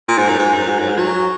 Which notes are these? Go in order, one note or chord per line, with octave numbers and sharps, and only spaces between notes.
A#2
G#2
F#2
G#2
F#2
G#2
F#2
G#2
F#3